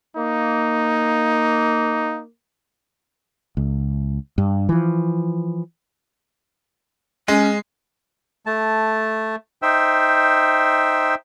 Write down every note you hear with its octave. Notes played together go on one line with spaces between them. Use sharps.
A#3 D#4
C#2
G2
E3 F3
G#3 C#4
A3 A5
D#4 C5 E5 G5 E6